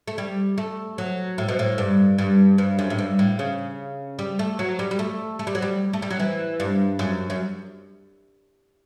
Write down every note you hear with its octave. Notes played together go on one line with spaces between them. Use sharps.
A3
G3
A3
F#3
A2
B2
A2
G2
G2
G2
F#2
A2
G2
A2
C#3
G3
A3
F#3
G3
G3
A3
A3
G3
F#3
G3
A3
G3
F#3
E3
G2
F#2
F#2